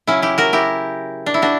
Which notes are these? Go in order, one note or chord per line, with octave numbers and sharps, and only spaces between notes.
C#3 F#3 C#4 E4
E4 G4
F#4 A#4
E4 G4
D4
E4
D4 F#4